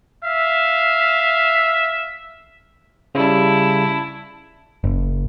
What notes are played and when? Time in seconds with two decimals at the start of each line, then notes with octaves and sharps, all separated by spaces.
0.24 E5 F5
3.15 C#3 G3 E4 A5
4.84 F#1